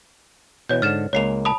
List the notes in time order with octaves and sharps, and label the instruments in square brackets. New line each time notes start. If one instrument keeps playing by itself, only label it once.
[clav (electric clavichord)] B2 E3 [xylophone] C#5 G6
[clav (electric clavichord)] G#2 D3 [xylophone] F6 A6 E7
[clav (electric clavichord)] C#2 G#3 A#3 [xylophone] C#5 C7 F7
[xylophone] A5 B5 D#6